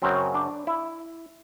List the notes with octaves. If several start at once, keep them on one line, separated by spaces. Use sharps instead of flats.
F#2 C#3 F#3 C4
D4
E4